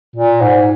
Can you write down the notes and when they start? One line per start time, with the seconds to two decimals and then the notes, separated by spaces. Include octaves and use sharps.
0.16 A#2
0.41 G#2